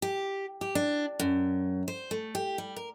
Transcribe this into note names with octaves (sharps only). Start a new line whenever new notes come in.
G4
G4
D4
F#2
C5
A3
G4
G3
A#4